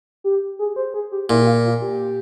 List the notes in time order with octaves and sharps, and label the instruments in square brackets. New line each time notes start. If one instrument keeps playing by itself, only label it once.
[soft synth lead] G4
G#4
C5
G#4
G4
[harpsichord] A#2 [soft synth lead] E4
[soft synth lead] G4
F4
F4
G4